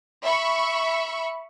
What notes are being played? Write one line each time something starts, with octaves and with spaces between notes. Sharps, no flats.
E5 B5 C#6